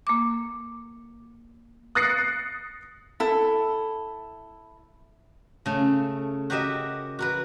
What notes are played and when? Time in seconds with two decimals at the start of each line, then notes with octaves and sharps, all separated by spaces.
0.07 A#3 D6
1.95 D#6 F#6 A6 A#6 C7 C#7
3.20 E4 A4
5.66 C#3 A3
6.50 F#4 G4 A#4 D#5 E5
7.19 F#4 A#4 B4